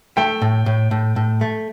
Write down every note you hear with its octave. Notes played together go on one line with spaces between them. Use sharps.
A3 G5
A2
A2
A2
A2
A3